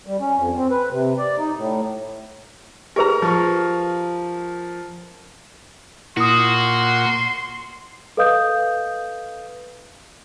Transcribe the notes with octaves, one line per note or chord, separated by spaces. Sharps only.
G3
C#4
F2
C4
B4
C3
D5
D#4
A2
G4 G#4 A#4 B4 A#5
F3 C#6
A#2 E4 F#4 C6 D#6
A4 B4 D#5 F5 D#6 G6